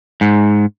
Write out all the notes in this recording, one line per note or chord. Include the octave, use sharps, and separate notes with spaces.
G#2